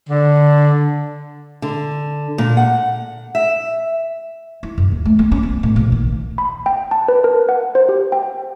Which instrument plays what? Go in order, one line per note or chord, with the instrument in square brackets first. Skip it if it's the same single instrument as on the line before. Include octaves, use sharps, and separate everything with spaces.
[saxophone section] D3
[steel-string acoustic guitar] D3
A#2
F#5
E5
[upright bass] E4
F#2
D#2
A3
A#3
C#4
B3
A2
A#1
D#3
[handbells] B5
G5
A5
B4
A#4
F#5
C5
G4
G5